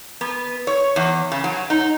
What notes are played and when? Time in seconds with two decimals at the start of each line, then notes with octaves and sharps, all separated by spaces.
0.21 B3
0.67 C#5
0.96 E2
1.32 C#3
1.44 F#3
1.70 D#4